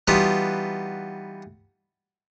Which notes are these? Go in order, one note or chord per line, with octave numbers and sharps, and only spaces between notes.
E3 G3 B3 D#4 F4 F#4